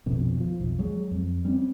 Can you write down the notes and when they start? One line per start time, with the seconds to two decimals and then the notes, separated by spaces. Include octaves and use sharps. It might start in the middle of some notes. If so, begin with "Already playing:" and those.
0.06 A#1 F2 B2
0.37 D#3 F3
0.60 B1 F2
0.79 F#3 G#3
1.11 F2
1.45 G3 C4 C#4